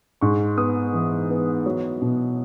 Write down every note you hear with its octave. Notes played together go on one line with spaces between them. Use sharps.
G#2 C#6
B3 D#6
E3
B3
F#3
B2